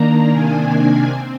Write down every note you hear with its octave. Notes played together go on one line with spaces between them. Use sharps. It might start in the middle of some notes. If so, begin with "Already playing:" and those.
Already playing: D#3 A#3 D4 A#5
C3 D#3 A#3 D4 G#5
C4